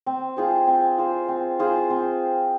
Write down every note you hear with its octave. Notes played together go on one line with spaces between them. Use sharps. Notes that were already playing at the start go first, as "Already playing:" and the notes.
C4
F4 G#4 C5
C4
F4 G#4 C5
C4
F4 G#4 C5
C4